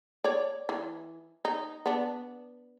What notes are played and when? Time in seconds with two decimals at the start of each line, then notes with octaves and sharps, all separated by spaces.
0.24 C#5 D5
0.69 E3
1.45 D#4
1.86 B3 D4